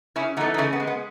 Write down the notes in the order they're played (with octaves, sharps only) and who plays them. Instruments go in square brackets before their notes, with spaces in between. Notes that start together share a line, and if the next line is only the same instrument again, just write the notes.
[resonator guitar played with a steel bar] C#3 C#4 E4
E3 A3 B3 D#4
D#4
C#3 A3 C#4
B3
G#3
B3